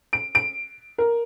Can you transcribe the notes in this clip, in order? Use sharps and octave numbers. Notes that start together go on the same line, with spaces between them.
D7
D7
A#4